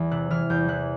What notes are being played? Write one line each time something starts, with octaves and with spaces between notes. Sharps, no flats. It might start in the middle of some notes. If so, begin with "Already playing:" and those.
Already playing: E2 E3
C3 F#6
E3 F6
E2 G6
E3 F#6